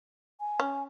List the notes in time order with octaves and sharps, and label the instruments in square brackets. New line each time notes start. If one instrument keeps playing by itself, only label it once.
[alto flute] G#5
[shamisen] C#4